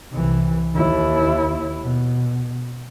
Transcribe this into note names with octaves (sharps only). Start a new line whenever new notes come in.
C2 E3
D#2 E4
B2